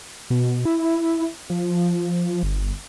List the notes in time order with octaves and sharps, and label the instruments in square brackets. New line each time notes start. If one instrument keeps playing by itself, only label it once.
[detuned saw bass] B2
E4
F3
G1